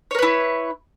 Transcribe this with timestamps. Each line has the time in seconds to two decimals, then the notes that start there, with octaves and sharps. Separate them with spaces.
0.11 C#5
0.15 A#4
0.19 B4
0.22 E4